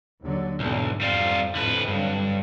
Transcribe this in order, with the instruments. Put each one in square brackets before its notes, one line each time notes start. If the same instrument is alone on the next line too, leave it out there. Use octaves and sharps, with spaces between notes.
[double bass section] D#2 D3 F#3
[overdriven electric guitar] B1 [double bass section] E2 G#2 D3
[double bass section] F2 [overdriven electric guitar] G3 F4
[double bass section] F2 A2 [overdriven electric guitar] D3 B4
[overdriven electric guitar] G2 [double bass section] D3 F#3